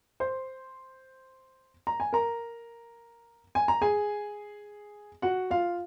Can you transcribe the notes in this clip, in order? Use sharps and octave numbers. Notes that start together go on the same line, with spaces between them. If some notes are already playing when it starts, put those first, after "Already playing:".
C5 C6
A#5
G#5
A#4 A#5
G#5
A#5
G#4 G#5
F#4 F#5
F4 F5